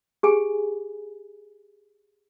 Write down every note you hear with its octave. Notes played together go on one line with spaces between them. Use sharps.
G4 G#4 G#5